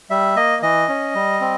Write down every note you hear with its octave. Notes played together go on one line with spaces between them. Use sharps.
G3 E5
A#3 D#5
E3 D#5
C#4
G3
C4